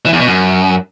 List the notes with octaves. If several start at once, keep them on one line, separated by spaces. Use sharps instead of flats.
E3
E2
B2
F#2